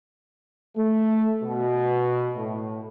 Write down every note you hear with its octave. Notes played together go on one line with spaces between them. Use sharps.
A3
B2
A2